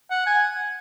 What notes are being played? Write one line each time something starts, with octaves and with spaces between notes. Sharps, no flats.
F#5
G#5